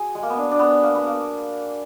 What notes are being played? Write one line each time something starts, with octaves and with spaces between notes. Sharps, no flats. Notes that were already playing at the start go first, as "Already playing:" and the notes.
Already playing: F#4 G#4
G#3
A#3
B3
D4
D4
B3
A#3
B3
A#3